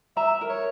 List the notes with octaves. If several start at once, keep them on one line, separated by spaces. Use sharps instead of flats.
E5 A#5
A#4
C#5